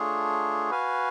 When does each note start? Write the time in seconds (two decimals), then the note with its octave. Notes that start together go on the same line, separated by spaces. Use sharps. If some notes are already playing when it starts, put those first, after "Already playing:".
Already playing: A3 D4 F4 G#4 C#5
0.70 F#4 B4 F5 G#5